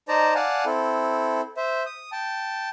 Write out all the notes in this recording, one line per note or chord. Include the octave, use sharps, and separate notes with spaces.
D#4 C5 D5 A5 A#5
D5 F5 F#5 G#5 A5
C4 E4 A4
C5 E5
D#6
G5 A5